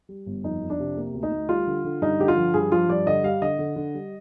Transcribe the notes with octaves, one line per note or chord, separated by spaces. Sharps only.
G3
G1
F2 D#4
F2
D4
C3
A#3
D2
D#4
D2
G3 F4
D3
D3
G2 D#4
D3 G4
F4
F3
G2 G#4
F3 F4
G2 D5
D3 D#5
G3 F5
D3 D#5
D3
D3
G3